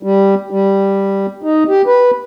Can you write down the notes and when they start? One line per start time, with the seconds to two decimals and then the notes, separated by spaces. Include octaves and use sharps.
0.03 G3
0.51 G3
1.43 D#4
1.68 G4
1.87 B4